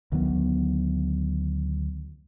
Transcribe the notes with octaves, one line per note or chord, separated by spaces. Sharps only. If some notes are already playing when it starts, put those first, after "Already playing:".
D2 D#3 F#3 B3